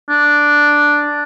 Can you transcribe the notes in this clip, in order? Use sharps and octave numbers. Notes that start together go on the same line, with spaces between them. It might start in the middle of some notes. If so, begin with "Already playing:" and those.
D4